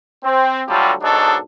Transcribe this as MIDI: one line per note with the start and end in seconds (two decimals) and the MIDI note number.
0.24 0.62 60
0.68 0.92 38
0.68 0.92 54
0.68 0.92 55
0.68 0.92 65
0.68 0.92 67
0.68 0.92 69
1.02 1.37 35
1.02 1.37 44
1.02 1.37 54
1.02 1.37 62
1.02 1.37 63
1.02 1.37 69